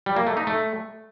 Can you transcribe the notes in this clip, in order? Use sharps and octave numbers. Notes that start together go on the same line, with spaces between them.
G3
A#3
A3
D#4
A3